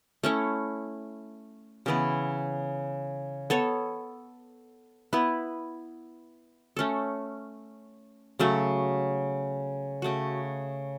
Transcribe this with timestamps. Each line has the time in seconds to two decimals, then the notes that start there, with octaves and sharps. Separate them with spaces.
0.24 A3 C#4 E4 C#5
1.86 C#3 E3 B3 E4
3.50 B3 A4 C#5
5.13 B3 E4 B4
6.77 A3 C#4 A4
8.39 C#3 F#3 A3
10.02 C#3 A3 F#4